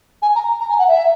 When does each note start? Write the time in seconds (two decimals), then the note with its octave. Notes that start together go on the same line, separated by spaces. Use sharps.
0.22 G#5
0.35 A#5
0.60 A#5
0.69 G#5
0.79 F#5
0.88 E5